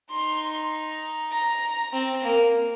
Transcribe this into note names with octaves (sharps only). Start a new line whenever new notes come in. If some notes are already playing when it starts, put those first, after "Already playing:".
D#4 C6
A#5
C4
A#3